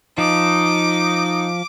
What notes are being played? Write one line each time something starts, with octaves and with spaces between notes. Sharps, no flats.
F3 D#4 D6